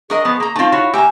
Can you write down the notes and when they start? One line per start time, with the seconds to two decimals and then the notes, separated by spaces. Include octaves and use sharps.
0.10 D4 G#4 A#4 D#5 C#6 D#6
0.25 F3 B3
0.40 A#3 A#5
0.56 A3 C4 D#4 F4 A5
0.72 E4 F#4 C#5
0.94 A#3 G4 E5 G#5 A#5